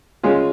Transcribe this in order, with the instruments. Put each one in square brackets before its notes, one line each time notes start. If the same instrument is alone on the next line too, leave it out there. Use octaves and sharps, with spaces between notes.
[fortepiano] C#3 G#3 C#4 F4